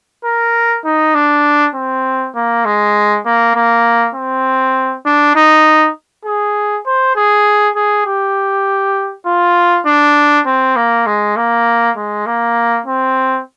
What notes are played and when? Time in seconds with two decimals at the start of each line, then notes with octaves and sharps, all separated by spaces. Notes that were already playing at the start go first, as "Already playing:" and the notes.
0.24 A#4
0.84 D#4
1.14 D4
1.75 C4
2.35 A#3
2.65 G#3
3.25 A#3
3.55 A#3
4.15 C4
5.06 D4
5.36 D#4
6.25 G#4
6.86 C5
7.15 G#4
7.76 G#4
8.06 G4
9.26 F4
9.86 D4
10.46 C4
10.76 A#3
11.06 G#3
11.36 A#3
11.96 G#3
12.26 A#3
12.86 C4